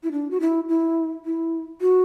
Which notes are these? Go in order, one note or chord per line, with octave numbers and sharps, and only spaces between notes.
E4
D4
F#4
E4
E4
E4
F#4